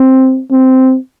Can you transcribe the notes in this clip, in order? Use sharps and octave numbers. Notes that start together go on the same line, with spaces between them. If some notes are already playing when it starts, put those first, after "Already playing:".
Already playing: C4
C4